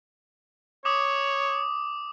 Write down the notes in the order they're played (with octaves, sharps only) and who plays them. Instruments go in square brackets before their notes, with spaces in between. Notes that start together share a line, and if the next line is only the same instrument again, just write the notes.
[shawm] C#5 [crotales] D6 D#6